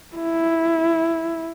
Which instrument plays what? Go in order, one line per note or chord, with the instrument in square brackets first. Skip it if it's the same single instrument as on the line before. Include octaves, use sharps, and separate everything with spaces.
[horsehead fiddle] E4